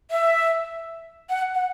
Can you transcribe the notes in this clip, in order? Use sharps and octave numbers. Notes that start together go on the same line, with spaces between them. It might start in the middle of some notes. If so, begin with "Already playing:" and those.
E5
F#5
F#5